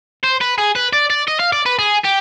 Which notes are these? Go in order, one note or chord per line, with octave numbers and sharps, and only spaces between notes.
C5
B4
G#4
B4
D5
D5
D#5
F5
D5
B4
G#4
G4